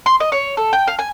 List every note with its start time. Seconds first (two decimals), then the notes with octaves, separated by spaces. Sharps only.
0.06 C6
0.20 D#5
0.32 C#5
0.57 A4
0.73 G5
0.87 F5
0.99 G#5